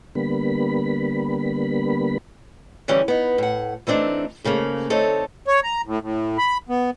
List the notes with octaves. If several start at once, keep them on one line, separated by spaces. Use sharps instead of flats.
D3 G3 A#3 B3 B5
D3 E3 G3 C#4
B3 D#4
A2 F#5
E3 A3 C4 D4 D#4
G#2 C#3 A3 A#3
D3 A3 C4 D#4 A4 C#5
C#5
A#5
A2
A2
B5
B3